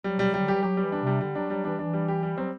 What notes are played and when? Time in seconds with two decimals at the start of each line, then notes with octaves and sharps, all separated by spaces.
0.04 F#3 G3
0.17 B2 G3
0.29 C3 G3
0.40 D3
0.48 E3 G4
0.63 F#3 G4
0.77 E3 G3
0.92 D3 D4
1.02 C3 G3
1.21 D3 G3
1.35 F#3 D4
1.50 F#3 G3
1.65 E3 D4
1.79 E3 D4
1.93 G3
2.08 G4
2.23 G3
2.37 F#3 C4